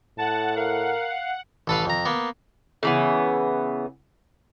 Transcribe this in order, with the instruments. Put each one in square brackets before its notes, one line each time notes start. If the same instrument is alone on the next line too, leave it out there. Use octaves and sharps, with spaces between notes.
[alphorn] A2 [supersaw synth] F#5 [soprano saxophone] A5
[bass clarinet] A#4 [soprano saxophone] F5
[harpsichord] A1 A4 B4 F5
F2 A#5
A#3 B3
[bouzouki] C#3 E3 B3